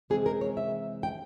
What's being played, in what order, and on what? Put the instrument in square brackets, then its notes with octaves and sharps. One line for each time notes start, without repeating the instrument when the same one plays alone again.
[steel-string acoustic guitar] C3 E3 G#3 C4 G#4
A#4
C#5
E5
G5